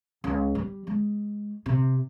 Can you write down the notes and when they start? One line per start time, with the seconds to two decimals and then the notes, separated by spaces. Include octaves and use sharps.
0.24 C#2
0.55 G3
0.87 G#3
1.66 C3